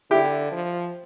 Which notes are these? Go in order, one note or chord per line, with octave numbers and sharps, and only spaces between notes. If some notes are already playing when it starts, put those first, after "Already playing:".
D3 E4 G4
F3